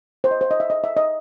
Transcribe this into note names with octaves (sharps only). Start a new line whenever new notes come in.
C5
D#5
C5
D#5
E5
D#5
E5
D#5